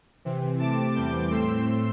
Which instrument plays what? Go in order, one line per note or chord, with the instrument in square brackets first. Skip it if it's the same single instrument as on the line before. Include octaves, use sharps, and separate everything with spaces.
[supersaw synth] C3 E3 C4
C3 A3 C4 A5 D6
E2 E3 G3 C4 D6 G6
A2 A3 C4 C6 E6